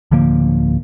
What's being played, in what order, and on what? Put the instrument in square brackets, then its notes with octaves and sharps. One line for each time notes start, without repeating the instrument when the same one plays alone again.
[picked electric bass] D1 D3 F3 A#3